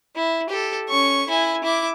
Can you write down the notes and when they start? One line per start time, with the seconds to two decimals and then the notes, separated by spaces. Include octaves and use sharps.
0.16 E4
0.50 G4 A4
0.90 C#4 C#6
1.28 E4 G#5
1.64 E4 D6